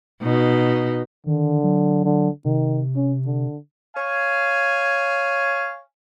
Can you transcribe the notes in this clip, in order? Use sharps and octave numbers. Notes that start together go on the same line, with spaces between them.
B2 D#4
D3 D#3
F#3
D3
C3 D#3
C#4
D3
C#5 F5 G#5